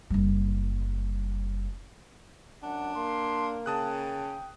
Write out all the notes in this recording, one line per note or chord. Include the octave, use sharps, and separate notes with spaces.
F#1 G3
F#2 D4 F#5
A#3 C6
C#3 G5 A5 D#6 F#6